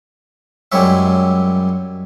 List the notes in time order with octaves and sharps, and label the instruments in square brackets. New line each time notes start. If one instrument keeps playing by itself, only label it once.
[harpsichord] F#2 G3 G#3 E4 C#5 E5